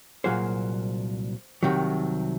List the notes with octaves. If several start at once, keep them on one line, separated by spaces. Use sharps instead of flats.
C2 A#2 F#3 A#3 F4 G#4 C5
C2 C3 D#3 F#3